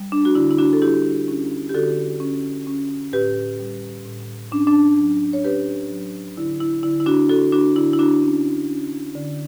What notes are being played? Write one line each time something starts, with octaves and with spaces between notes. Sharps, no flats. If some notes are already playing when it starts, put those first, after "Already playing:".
Already playing: G3
D4
F#4
D3 E4
E4
D4 F#4
A4
G3 E4 G4
C#4
G4
D3 F#4 A4
C#4
C#4
A2 G4 B4
G3
A2
C#4 D4
D4
F#3
C#5
C#4 G4 B4
F#3
D3 E4
E4
D3 E4
E4
D4 F#4
D3 F#4 A4
D4 F#4
D3 E4
E4
D4 F#4
C#4
C#4
D3